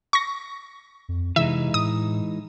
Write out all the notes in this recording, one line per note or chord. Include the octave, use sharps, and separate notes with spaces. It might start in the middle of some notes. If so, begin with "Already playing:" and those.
C#6 A#6
F2
C3 E3 G#3 D#4 E5
A2 D#6